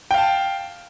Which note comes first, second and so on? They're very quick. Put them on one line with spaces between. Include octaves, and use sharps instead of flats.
G5 F5 A5